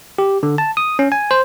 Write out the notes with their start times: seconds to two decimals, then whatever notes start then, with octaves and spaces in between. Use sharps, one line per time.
0.18 G4
0.43 D3
0.58 A5
0.77 D#6
0.99 C#4
1.12 G#5
1.31 C5